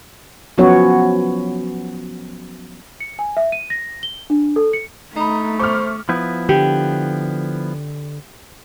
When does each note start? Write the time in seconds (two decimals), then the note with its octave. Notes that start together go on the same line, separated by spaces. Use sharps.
0.58 F3 F#3 B3 C#4 F#4 C#5
3.00 C#7
3.19 G#5
3.37 E5
3.52 D#7
3.70 A#6
4.03 G7
4.30 D4
4.56 A4
4.73 C#7
5.16 A3 D#4 A#5 B5
5.59 C5 C#6 D6 F6
6.09 F3 B3 E4
6.49 D3 G4